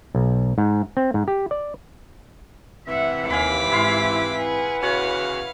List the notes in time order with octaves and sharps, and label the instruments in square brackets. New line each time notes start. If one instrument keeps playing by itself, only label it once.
[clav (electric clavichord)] B1
G#2
C4
G#2
G4
D5
[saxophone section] C3 E3 [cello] E5 F#5
[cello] D#2 [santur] F5 G#5 B5 [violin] D6 B6
[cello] G#2 [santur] E4 F5 C6
[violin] G#4 [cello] B4 F#5
[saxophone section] E2 C#3 F#4 [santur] C#5 [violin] F5